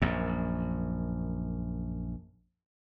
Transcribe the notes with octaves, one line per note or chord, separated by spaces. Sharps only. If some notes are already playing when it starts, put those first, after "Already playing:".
A#1 F#2